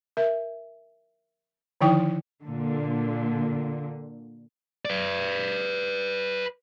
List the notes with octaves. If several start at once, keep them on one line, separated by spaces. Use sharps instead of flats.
A#4 E5
D3 D#3 F3 D#4 E4 G5
A#2 D3
B4 D5